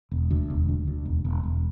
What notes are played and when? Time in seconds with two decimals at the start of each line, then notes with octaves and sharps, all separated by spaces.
0.11 E1
0.31 D2
0.50 E1
0.69 D2
0.87 D2
1.06 E1
1.25 E1
1.43 E1